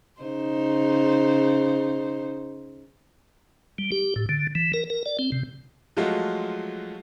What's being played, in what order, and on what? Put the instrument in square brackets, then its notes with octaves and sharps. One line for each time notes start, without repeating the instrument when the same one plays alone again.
[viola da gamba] C#3 D#4 C5
[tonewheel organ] G3
G4
A2
D3
E3
A#4
A#4
D5
C4
C3
[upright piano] F3 F#3 G#3 A3 F4 F#4